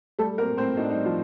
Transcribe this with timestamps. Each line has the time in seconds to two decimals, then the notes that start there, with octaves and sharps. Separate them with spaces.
0.19 G3 A3 A4
0.38 A#3 C4 A#4
0.57 A2 C4 C5
0.77 A2 D#4
0.84 D4
0.91 D#4
0.96 G3
1.05 F3 F4